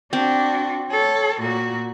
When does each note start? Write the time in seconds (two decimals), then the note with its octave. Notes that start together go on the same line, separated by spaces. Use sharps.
0.13 C4 D4 F#4
0.91 A4 C#5
1.41 A#2 F#4